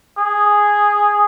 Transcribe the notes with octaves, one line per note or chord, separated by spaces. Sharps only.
G#4